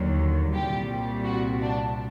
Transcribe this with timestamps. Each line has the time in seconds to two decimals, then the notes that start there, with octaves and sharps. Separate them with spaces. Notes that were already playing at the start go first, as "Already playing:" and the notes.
Already playing: D#2 D3 F#3
0.53 C2 A#2 G3 G4
1.25 F#4
1.61 D4